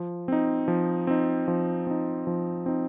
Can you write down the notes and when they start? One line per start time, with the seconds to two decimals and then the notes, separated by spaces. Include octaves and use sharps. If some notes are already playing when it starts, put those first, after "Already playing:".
Already playing: F3
0.28 C4 D#4
0.68 F3
1.07 C4 D#4
1.48 F3
1.87 C4 D#4
2.27 F3
2.66 C4 D#4